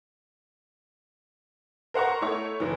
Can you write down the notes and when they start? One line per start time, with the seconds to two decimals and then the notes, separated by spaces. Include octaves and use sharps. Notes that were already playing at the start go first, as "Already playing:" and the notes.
1.94 A#4 C5 F#5 A#5 C#6
2.21 A3 E4 C#5 C#6
2.60 F#1 E3